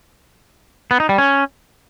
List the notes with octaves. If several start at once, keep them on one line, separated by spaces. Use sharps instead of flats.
B3
D#4
G3
C#4